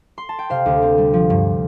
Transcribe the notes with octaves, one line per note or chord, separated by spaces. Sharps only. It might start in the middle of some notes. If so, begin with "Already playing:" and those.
C6
A5
G5
C3 C5 F5
D2
C4
G3
F3
G2